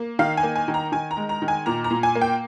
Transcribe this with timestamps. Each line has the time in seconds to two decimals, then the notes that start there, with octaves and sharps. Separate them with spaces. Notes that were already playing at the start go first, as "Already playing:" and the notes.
Already playing: A#3
0.19 D#3 F5
0.37 G#5
0.43 A#3
0.56 G#5
0.68 D#3
0.74 A#5
0.92 D#3 G#5
1.11 A#5
1.17 G#3
1.29 A#5
1.42 D#3
1.48 G#5
1.66 A#2 A#5
1.84 A#5
1.91 A#2
2.03 G#5
2.15 A#3
2.21 G5